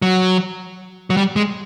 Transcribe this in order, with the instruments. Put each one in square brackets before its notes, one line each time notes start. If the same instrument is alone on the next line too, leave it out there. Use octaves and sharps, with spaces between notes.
[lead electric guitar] F#3
F#3
G3
G#3